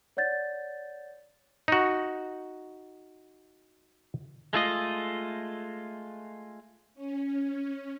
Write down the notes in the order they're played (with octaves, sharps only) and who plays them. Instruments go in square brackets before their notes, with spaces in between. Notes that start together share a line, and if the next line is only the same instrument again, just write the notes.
[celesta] C#5 D5 F#5 G6 A6
[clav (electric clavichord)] D#4 F#4
[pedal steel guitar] G#3 A3 F4 D#5
[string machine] C#4